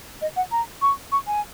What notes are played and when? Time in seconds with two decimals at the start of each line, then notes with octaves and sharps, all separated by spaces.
0.21 D#5
0.36 F#5
0.51 A#5
0.82 C#6
1.12 C#6
1.27 G#5